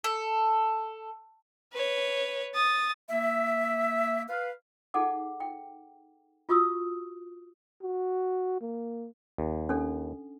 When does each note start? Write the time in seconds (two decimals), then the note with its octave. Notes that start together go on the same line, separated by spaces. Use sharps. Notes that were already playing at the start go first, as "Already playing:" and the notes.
0.04 A4
1.73 B4 C#5
2.55 D#6 A6
3.10 A#3 E5
4.29 B4 F5
4.94 D#4 G#4 A4 F#5 D6
5.40 G5
6.49 F4 F#4 C#6 D#6 E6
7.83 F#4
8.61 A#3
9.38 D#2
9.69 C#4 D4 A4